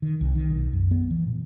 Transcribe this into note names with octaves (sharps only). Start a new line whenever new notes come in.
D#3
C2
D#3
B1
F#2
B3
E3
A#2